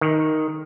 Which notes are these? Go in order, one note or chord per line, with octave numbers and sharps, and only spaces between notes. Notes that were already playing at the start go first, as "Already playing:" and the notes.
D#3